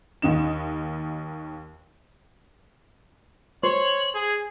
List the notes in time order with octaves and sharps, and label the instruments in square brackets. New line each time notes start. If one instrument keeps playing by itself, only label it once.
[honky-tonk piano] D#2 D#3 D#4 E7
[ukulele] C5 [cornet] C#5 [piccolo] F#7
[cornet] G#4 [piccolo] G#6